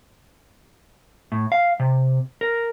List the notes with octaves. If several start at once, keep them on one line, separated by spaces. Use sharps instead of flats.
A2
F5
C3
A#4